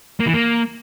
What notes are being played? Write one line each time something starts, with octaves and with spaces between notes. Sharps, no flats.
A#3
E3
A#3